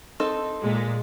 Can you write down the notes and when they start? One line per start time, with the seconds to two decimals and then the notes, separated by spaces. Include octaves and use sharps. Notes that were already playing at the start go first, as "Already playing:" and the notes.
0.20 C4 D#4 A4
0.60 A#2 G#3